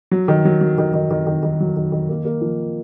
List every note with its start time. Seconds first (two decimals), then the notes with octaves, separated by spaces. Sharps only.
0.11 F#3
0.28 D#3
0.45 F#3
0.61 F#3
0.78 D#3
0.93 D#3
1.11 D#3
1.27 D#3
1.43 D#3
1.60 F#3
1.76 D#3
1.92 D#3
2.09 A#3
2.25 A#3
2.42 F3